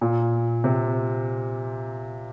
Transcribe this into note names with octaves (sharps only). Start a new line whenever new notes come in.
A#2
C3